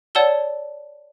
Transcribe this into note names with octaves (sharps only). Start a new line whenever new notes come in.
C#5 D5 F#5 A5 E6 G7